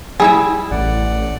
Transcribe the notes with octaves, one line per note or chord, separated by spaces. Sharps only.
G3 E4 G#4 E5
A1 D5 F#5